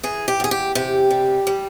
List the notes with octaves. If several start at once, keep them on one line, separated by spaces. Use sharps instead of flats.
E3 G#4
G4
E2 G#4
G4
C3 G4
G3
G3